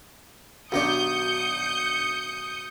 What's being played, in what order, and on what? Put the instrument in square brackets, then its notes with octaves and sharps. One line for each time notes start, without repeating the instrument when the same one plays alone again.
[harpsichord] B1 D#3 G4 [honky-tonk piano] D4 F#4 [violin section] D#6 G6 C#7